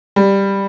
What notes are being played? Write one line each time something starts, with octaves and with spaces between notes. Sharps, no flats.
G3